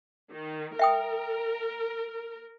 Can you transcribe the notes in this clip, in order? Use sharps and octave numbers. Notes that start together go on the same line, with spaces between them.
D#3
A#4 E5 G5 D#6